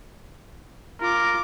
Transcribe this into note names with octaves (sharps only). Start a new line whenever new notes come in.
F4 A#4 D6